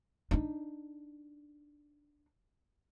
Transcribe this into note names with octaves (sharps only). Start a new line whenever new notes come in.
D4 D#4